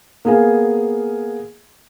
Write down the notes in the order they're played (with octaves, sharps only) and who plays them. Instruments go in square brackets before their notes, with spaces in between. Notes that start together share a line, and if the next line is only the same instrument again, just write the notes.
[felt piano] A#3 B3 G#4 F5 G#5